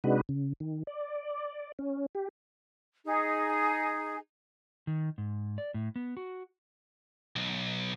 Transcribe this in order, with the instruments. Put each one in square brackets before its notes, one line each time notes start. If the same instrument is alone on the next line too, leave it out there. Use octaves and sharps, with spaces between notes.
[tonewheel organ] C3 G#3 D4 D#4 F#4 B4
C#3
D#3
D5
C#4
G4
[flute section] D#4 G#4
[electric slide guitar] D#3
G#2
D5
A2
B3
F#4
[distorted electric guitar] B1